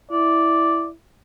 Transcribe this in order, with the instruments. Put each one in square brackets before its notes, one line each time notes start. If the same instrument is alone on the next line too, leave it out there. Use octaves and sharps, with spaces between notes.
[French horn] E4 [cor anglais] D5